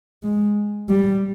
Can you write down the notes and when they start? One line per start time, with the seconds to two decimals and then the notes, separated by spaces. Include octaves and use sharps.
0.23 G#3
0.89 G3